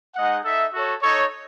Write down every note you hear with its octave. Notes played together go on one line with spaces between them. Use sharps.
G#3 D#4 G#4 D#5 F#5
D#4 A4 E5
F#4 A4 C#5
D#4 A4 C#5